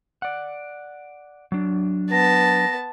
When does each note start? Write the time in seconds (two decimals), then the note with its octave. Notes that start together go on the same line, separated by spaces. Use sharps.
0.22 D5 F#5
1.52 F#3 D4
2.11 B3 A5 A#6